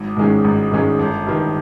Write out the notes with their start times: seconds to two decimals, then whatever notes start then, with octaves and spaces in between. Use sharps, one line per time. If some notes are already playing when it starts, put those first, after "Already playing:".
Already playing: G#1
0.17 G#2 D#3 G#3 C#4
0.44 G#1
0.72 G#2 D#3 G#3 C#4
0.99 G1
1.27 G2 D#3